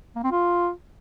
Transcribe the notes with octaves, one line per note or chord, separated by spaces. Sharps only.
A#3
C4
F4